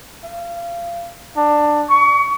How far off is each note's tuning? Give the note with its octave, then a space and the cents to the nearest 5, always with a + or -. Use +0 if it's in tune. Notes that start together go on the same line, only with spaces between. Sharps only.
F5 -25
D4 +15
C#6 +30